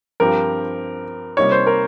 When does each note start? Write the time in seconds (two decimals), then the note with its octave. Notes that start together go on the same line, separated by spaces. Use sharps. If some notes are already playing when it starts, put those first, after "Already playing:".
0.20 G2 F3 C4 G4 A#4
1.37 C3 G3 A#3 D#4 C#5
1.52 C5
1.67 A#4